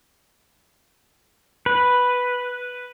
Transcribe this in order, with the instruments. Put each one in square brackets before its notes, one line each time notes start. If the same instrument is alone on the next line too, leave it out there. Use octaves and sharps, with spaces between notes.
[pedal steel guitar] B4